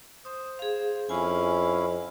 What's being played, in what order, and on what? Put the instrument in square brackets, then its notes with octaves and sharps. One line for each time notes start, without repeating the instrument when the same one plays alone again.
[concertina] C5 [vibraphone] D#6
[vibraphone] G#4 F5
[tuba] F2 [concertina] C#4 E4 F5 [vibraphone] G#5